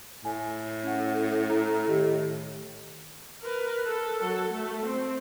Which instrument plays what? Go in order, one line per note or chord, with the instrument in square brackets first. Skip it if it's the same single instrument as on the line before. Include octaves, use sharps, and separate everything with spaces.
[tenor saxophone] A2 [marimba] G#5
[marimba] C#4 F#5
E4 A#5
D#3 G4 D#5
[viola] A#4 B4
A4
F#3 A4
A3
C4